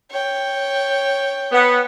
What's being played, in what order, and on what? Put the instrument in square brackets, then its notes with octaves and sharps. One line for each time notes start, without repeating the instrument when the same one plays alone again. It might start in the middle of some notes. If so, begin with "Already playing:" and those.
[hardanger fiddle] C#5 G5
[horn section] B3